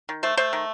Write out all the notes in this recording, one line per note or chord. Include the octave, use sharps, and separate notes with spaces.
D#3
A3 C5
A3 C5
D#3